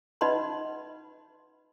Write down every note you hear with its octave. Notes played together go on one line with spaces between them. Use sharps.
D#4 B4 D#5 F#5 B5 C6